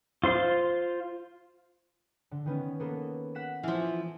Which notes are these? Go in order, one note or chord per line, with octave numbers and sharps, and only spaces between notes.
F4 C5 C6
D3
D#3 B3 C#4
A#3 B3 A4
F#5 B6 E7
E3 F3 F6